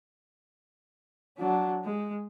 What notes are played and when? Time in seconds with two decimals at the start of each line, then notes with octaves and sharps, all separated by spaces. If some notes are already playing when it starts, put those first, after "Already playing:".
1.37 F#3 D4
1.85 G#3